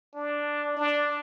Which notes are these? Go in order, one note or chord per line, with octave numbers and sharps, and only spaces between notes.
D4
D4